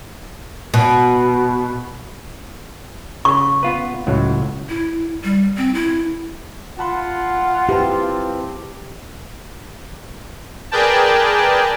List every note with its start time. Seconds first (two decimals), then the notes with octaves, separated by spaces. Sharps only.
0.74 B2
3.25 C#3 C#6
3.63 B3 F4 B4
4.07 C#2 A2 F#3
4.69 E4
5.24 G3
5.57 C4
5.74 E4
6.79 F4 F#5 A5 B5 C6
7.69 C4 E4 G4 B4 A5
10.71 G#4 A#4 B4 D5 G5 A5